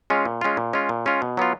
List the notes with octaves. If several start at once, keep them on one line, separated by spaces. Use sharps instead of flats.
G#3 C#4 F4
A#2
G#3 C#4 F4
A#2
G#3 C#4 F4
A#2
G#3 C#4 F4
B2
F#3 B3 F4